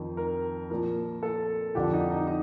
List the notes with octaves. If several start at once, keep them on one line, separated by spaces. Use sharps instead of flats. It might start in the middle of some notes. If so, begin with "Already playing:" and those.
Already playing: F2 D#3
A#4
A#2 F3 A#4
A4
F2 D3 F3 G4
D#4
D#4
D#4